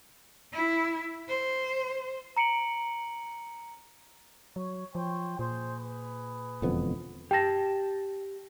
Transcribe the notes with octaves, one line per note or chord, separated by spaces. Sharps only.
E4
C5
A#5 C#7 D7 F#7
F#3 C#5
F3 C5 C#5 G5
A#2 G#4 C5
G#4 B4
E1 F2 D3 B3
G4 G5 A5 A#6